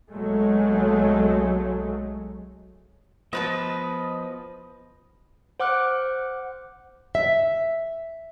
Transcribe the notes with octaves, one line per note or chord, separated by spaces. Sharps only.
B1 F#3 G#3 A3
F3 B3 G#4 B4 D#5 A5
C5 F#5 D6 F6 F#6
E5